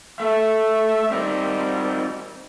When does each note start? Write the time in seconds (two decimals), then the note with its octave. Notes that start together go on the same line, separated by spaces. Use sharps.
0.20 A3 E5
1.10 G3 C4 D#4 A#4